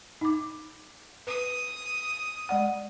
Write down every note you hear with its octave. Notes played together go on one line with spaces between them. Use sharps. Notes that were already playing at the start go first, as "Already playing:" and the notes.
D#4 D6
B4 D#6
G#3 D5 F#5